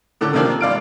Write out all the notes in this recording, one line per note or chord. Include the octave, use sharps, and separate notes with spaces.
A2 D3 A4 D6
C3 D#3 F3 A#3 C4 D4
G#1 D5 F5 D7